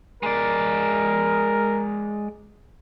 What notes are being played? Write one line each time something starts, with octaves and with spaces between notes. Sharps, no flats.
G#3 A#4 D5